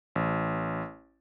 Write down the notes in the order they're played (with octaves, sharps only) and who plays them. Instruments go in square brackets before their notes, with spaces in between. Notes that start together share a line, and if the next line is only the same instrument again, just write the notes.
[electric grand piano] A1